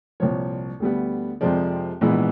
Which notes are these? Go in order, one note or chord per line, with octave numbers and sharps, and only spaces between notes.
C2 A#2 F3 C#5
D2 D3 G3 B3
F2 C3 F3 G#3 D5
A#1 G#2 E3 G#3 B3